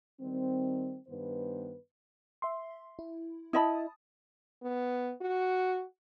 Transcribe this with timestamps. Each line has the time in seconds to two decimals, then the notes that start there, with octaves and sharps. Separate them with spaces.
0.21 D#3 G3 C4
1.08 G2 D#3 B3 B4 C5
2.42 E5 C6
2.99 E4
3.53 E4 D#5 A5 B5 D#6
4.63 B3
5.21 F#4